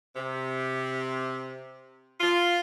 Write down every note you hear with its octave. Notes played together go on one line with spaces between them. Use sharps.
C3
F4